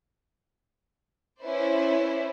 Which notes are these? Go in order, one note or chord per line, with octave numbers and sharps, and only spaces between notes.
C#4 E4 B4 C5 D5